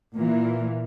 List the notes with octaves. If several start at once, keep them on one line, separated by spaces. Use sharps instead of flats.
A#2 E3